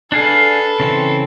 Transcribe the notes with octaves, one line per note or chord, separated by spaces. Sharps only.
D4 G#4 A4 B4 F5
C#3 E3 C4